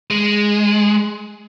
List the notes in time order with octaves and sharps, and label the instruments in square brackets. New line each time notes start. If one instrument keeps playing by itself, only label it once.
[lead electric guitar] G#3